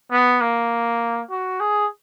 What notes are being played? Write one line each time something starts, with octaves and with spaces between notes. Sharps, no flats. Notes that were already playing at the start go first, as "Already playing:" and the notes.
B3
A#3
F#4
G#4